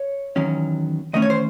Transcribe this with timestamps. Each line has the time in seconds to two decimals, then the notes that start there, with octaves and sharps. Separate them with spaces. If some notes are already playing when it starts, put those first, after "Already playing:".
Already playing: C#5
0.36 E2 D#3 F#3 C#4
1.13 E2 D#3 A3 C#4 D#5
1.22 C#5
1.30 C5